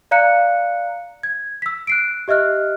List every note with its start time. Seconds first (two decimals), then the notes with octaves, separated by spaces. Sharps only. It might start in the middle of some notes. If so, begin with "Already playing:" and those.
0.11 D5 F5 A#5 F#6 C#7
1.23 G#6
1.62 E6 B6
1.87 F#6 C7 D7
2.28 G4 D#5 E5 F6 F#6